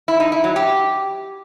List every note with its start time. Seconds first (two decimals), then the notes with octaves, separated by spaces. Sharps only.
0.08 E4
0.20 D#4
0.32 E4
0.44 F#3
0.56 G4